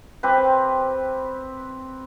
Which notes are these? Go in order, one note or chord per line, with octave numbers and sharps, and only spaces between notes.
C4 G4 B4